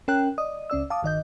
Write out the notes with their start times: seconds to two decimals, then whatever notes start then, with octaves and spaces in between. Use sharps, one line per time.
0.08 C#4 A#4 G5 F#6
0.38 D5 D#5 D#6
0.70 C#2 C#4 D5 E6
0.90 F5 A5 D6 D#6
1.03 G1 D#3 D#5 G6